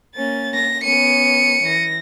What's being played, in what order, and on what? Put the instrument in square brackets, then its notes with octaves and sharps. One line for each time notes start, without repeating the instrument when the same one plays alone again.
[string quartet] A#3 C#4 A6
[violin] A#6
[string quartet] B3 C#4 [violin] C#7 D#7
[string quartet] E3 A#6